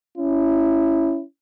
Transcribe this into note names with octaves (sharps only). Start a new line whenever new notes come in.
C#4 E4